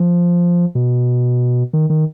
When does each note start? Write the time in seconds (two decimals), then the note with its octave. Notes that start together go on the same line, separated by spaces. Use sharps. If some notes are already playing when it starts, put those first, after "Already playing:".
Already playing: F3
0.75 B2
1.73 D#3
1.90 D#3